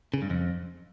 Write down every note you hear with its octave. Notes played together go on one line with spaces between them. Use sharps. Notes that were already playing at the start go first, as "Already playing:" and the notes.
C#3
G2
F2